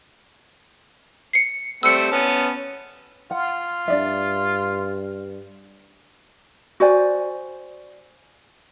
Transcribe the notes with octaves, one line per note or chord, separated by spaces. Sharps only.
C7 C#7
G3 A3 C4 E6 C#7
B3 C#4 A5
F4 F#5
G2 D4 D5 E5
F#4 C5 D5 G#5